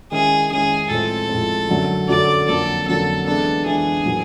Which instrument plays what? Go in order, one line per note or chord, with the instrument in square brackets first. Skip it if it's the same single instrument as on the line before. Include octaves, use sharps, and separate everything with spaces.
[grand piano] D#3 G#3 C#4 E4 [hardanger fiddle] G#4
[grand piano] D#3 G#3 C#4 E4 [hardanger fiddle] G#4
[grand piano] A2 F3 G#3 C4 [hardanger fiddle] A4
[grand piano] A2 F3 G#3 C4
F#2 D3 F#3 A3
[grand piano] F#2 D3 F#3 A3 [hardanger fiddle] D5
[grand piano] F2 D3 F#3 A#3 [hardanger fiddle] A4
[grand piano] F2 D3 F#3 A#3 [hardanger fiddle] A4
[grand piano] E3 G#3 B3 D4 [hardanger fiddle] A4
[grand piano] E3 G#3 B3 D4 [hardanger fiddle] G#4
[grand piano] A2 F#3 A#3